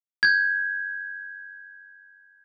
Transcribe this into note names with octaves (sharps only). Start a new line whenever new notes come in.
G6 G#6